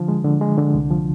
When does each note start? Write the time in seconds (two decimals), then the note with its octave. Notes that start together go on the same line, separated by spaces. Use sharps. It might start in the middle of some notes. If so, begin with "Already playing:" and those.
Already playing: D3 F3
0.08 G#3
0.24 D3
0.41 G#3
0.58 D3
0.75 C2
0.91 F3